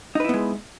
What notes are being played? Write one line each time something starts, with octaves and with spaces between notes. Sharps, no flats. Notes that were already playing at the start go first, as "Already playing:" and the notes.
G#3 B3 D#4 E4 B4